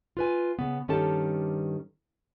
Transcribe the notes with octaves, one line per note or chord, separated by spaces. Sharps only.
F4 B4 G#5
C#3 B3
G2 D#3 C#4 G4 A4 A5